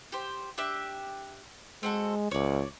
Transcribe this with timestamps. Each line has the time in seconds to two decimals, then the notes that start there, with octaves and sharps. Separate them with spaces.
0.12 G4 C5
0.58 D4 G4 E5
1.83 G#3 C4 F#4 A4
2.31 C#2 C#5 D5